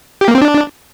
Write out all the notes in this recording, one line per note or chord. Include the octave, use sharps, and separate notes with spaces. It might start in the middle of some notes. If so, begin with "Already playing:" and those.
G4
A#3
C4
D4